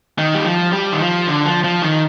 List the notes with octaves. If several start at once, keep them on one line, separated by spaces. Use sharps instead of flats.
D#3
G3
F3
G3
D#3
F3
D3
F3
F3
D#3